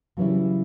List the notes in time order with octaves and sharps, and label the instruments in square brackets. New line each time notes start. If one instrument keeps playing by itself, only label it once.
[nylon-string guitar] C#3 E3 G3 C#4 E4 [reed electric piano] F#3